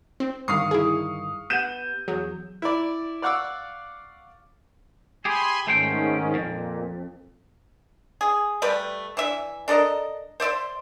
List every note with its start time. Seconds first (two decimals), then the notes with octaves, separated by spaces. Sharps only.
0.20 C4
0.48 C2 G2 D3 D#3 F5 C#6 D#6 C7
0.71 E4 G#4
1.50 B3 G4 F#5 G6 D#7 E7
2.08 E2 F#3 G#4
2.62 E4 D5
3.22 D5 F5 F#5 C#6 D6 E6
5.25 G4 G#4 G#5 B5 C6
5.67 G#2 D#3 A3 C#4 C5 G5
6.35 F2 A#2
8.21 G#4
8.62 G3 A3 G4 B4
9.17 E3 D4 E5
9.68 D4 A4 A#4 D#5
10.40 C5 D5 E5 C6